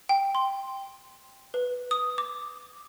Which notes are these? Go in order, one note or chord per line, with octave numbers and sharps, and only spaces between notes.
G5
C6
B4
D#6
D6